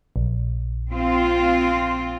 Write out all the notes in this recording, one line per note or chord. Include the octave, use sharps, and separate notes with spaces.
A#1
C4 F4